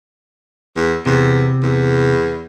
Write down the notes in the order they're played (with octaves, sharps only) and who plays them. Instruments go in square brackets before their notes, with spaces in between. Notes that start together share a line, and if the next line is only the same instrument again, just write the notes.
[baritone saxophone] E2
[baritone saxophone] E2 [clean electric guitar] C3
[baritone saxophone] E2